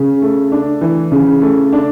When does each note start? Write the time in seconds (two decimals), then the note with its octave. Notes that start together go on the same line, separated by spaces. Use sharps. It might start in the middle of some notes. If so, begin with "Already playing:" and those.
Already playing: C#3
0.22 A3
0.52 D4
0.81 E3
1.12 C#3
1.42 A3
1.73 D4